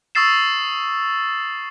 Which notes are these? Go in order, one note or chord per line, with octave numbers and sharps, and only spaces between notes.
C#6 D#6 E6 A6 C7 E7